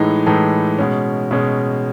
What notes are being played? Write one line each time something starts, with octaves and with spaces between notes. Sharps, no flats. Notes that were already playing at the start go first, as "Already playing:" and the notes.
Already playing: A2 E3 G#3 D#4 A4
A2 E3 G#3 D#4 A4
B2 G#3 C#4
B2 G#3 C#4